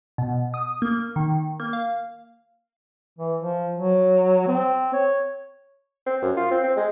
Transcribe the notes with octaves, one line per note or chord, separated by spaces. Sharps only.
B2
D#6
A#3
D#3
A#3
F5
E3
F3
F#3
C4
C#5
C4
F#2
F4
C4
C4
G#3